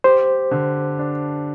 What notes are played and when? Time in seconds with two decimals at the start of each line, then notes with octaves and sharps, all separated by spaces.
0.04 G4 C5
0.51 D3
0.99 D4